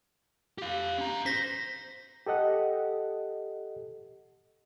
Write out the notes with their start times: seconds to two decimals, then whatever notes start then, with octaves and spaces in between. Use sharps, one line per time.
0.58 G4 F5
0.98 C#4 A#5
1.26 C5 A#6 B6
2.26 G4 A4 D#5 F#5